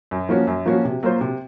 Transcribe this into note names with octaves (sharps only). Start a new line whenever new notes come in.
F#2
F3 A#3 C#4 F#4
F#2
F3 A#3 C#4 F#4
C3
F#3 A#3 F4 C5
C3